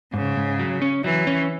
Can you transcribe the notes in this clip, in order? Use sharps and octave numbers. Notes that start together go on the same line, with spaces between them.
G#2 C#3
G#2
F#3
C#4
E3 F#3
C#4